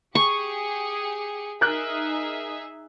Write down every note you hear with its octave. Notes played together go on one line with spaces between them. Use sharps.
G4 G#4 C#6 C#7
D#4 G#4 A#4 E5 F#6